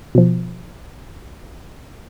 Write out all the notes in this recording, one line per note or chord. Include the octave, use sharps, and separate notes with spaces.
B2 F3